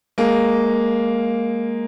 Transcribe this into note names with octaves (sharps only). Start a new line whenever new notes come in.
G#3 A#3